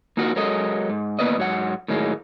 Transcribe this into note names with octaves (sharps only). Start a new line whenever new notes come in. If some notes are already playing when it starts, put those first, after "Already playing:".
A#3 D#4 F4 F#4 G#4 A#4
F#3 G#3 A4 A#4 D#5
G#2
A2 A#3 B3 B4 D5 D#5
G#2 F#3 F#5
A2 D#3 F#3 G#3 A#3